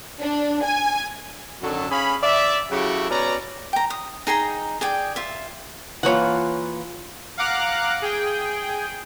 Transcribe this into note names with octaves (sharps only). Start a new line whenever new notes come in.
D4
G#5
F#2 D3 D#3 F#3 F#4 A4
C#4 G#4 F5 B5
D5 E5
C#3 F#3 E4 F#4 G4 A4
B2 C#4 C#5 D5 A#5
G5 A#5
D#6
D#4 G#4 G5 A#5
G#4 D5 G5
F4 E5
E3 A#3 F4 C#5 F#5
F5 F#5 A#5 D6 F#6
G#4 G5